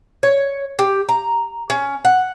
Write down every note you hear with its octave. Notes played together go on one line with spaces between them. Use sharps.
C#5
G4
A#5
C#4
F#5